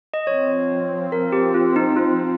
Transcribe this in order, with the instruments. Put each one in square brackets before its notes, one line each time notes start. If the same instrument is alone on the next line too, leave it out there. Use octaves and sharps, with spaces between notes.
[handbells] D#5
[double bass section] F3 C4 [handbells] C#5
[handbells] A#4
G4
F4
D#4
F4